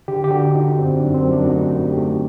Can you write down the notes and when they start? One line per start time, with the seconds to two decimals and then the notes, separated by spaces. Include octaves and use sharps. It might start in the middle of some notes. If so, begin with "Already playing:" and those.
0.08 D3 G4
0.24 G4
0.31 D3 F#4
0.55 D3 D#4
0.78 F#2 C4
0.97 D4
1.03 F#2
1.14 C4
1.27 F#2
1.33 D4
1.45 F#4
1.50 A3 D#4
1.74 F#2
1.87 G4
1.98 A3